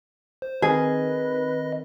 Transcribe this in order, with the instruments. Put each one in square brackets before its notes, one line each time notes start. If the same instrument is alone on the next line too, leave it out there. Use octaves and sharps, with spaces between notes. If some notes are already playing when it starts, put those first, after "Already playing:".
[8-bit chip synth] C5
[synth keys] D#3 C4 A#4 [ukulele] G#4 [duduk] B4 [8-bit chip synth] D#5